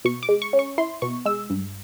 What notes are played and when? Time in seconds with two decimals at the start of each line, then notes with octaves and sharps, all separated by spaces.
0.05 B2 C#6
0.23 D6
0.29 G#3
0.42 C#6
0.53 C#4
0.59 C#6
0.78 E4 C6
1.02 B2 C#6
1.26 G#3 E6
1.50 G2